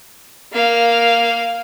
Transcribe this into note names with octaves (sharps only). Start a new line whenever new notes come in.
A#3 F5